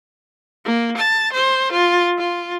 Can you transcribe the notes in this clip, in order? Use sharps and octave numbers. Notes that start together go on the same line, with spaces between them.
A#3
A5
C5
F4
F4